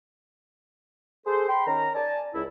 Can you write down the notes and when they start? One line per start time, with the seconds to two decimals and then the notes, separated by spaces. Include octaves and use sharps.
1.27 G#4 A4 C5
1.49 G5 B5 C6
1.67 D#3 C#4 A#4 A#5
1.95 D5 G#5 A5
2.35 C#2 E4